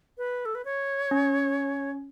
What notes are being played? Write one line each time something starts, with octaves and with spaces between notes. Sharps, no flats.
B4
A4
B4
C#5
C#4